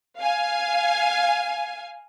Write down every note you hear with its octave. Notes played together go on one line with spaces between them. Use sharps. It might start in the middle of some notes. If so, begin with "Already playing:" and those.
F5 G#5